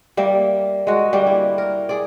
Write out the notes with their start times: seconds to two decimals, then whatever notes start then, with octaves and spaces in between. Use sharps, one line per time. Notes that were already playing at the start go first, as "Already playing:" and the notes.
0.17 G3 A#3 E5
0.87 G#3 F#4
1.13 D3 G3 A#3
1.26 E4
1.58 A#4
1.89 G#4 D5